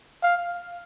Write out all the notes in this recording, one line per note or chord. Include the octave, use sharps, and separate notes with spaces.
F5